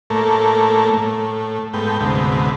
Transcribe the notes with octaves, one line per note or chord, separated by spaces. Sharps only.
A2 A3 A#3
A2
G#2 A3 B3 G5
D2 G#2 C3 B3